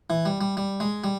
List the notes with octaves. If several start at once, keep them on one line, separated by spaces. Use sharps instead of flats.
E3
G3
G3
G3
G#3
G3